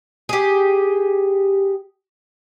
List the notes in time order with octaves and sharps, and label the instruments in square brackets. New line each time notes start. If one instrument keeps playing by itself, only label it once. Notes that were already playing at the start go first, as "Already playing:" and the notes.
[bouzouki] G4 G#4